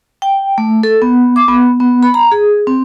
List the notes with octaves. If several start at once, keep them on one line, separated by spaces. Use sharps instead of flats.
G5
A3
A4
B3
D6
B3
B3
B5
A#5
G#4
C4